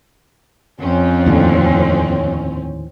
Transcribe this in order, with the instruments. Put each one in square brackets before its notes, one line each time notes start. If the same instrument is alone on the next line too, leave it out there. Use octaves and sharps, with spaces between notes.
[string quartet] F2 [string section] C4 C#4
[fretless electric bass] D#2 A2 D3